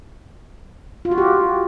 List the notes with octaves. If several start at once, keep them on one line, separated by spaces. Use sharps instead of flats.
F4
F#4
G4